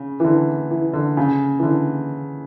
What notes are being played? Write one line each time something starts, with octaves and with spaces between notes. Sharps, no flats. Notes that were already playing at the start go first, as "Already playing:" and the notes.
Already playing: C#3
E3
D3
E3
D3
C#3
E3
D3